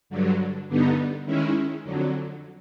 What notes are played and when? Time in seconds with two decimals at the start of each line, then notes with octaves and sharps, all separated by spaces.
0.10 G2 D3 F#3
0.68 G2 D3 G3 B3 D#4
1.26 D#3 G#3 C#4 E4
1.84 F2 D3 F#3